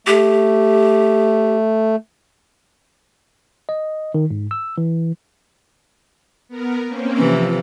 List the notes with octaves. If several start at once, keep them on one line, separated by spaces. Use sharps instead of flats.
A3 G4
D#5
D#3
G#2
E6
E3
B3 A#4
A#3 C4 C#4
C3 E3 F3